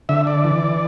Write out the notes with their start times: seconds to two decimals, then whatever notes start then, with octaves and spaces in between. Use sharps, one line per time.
0.09 D3 E5
0.27 D5
0.44 E3